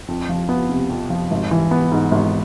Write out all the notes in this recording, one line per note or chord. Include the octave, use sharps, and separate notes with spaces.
F2
F3
B3
C3
F2
F3
G#1
E3
B3
G#2
G#1